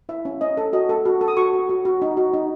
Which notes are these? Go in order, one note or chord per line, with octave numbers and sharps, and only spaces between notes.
E4 E5
C#4
C#4 D#5
A4
F#4 D#5
A4
F#4
A4
D#6
F#4 C#6
F#4
F#4
F#4
D#4
F#4
D#4